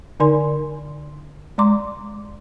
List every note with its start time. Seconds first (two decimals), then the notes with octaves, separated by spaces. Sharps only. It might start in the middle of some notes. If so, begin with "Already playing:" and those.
0.20 D3 D#4 A#4 D5 G#5 C6
1.58 G#3 D5 A#5 C6 D6